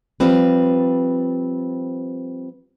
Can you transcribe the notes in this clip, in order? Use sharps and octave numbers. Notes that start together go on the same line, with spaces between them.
F3 G3 C4 B4